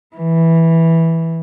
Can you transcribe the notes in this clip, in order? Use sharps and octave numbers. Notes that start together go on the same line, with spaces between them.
E3